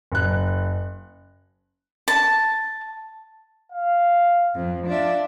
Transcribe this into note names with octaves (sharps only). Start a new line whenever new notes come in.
F#1 F#6
A5
F5
F2
D4 F4 D5 E5